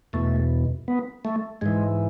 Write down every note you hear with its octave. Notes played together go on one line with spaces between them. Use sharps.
E2 B2 A3
B3
A3
G#2 E3 G#3